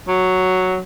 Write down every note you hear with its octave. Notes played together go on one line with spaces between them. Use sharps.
F#3